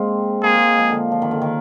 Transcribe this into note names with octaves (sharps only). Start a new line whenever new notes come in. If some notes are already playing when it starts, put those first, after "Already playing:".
Already playing: G#3 A#3 C4
A#3 G#4
G#3
F3
D3
F3
D#3
D3
D#3